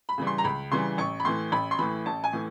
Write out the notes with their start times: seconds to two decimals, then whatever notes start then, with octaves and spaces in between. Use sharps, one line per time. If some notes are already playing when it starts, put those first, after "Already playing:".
0.09 B5
0.18 C#3 E3 G3
0.27 C6
0.38 A#5
0.44 C#2 B5
0.72 C#3 E3 G3 C6
0.98 A1 C#6
1.20 B5
1.25 A2 E3 C6
1.52 A1 B5
1.71 C6
1.79 A2 E3 B5
2.06 A1 A5
2.24 G#5
2.33 A2 E3